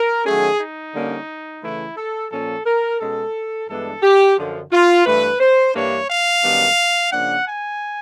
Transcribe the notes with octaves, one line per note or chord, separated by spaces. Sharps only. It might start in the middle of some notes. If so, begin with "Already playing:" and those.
Already playing: A#4
D#3 F#3 A3 C#4 G#4
D#4
D3 G3 A#3 C#4
C#3 E3 A3 E4
A4
A#2 F3 A#3 C#4 A4
A#4
B2 G#3 C#4 A4
G2 E3 G#3 B3 D4 A4
G4
F#2 D3 F3
F4
G2 E3 A3 B4
C5
G2 E3 G3 A#3 D4 C#5
F5
F#2 D#3 G3 B3 D4
C#3 F3 A#3 D4 F#5
G#5